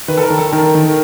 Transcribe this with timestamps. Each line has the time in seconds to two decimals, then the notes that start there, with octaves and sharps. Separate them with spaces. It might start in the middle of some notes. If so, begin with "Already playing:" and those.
0.08 D#3 B4
0.17 A4
0.23 A#4
0.30 D#3
0.38 A4
0.52 D#3 A#4
0.75 D#3